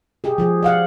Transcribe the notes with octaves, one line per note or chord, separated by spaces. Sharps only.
G4 G#4
F3 G#4
D5 F5 F#5